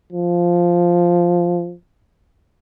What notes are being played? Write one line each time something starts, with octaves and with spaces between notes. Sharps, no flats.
F3